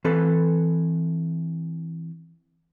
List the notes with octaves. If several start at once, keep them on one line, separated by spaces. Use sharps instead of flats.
E3 C4 A4 B4